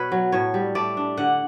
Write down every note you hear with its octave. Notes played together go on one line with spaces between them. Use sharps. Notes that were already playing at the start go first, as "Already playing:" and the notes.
Already playing: B2 B4 C#5
F#3
A2 C#5
G3
A3 D5
D4
D3 F#5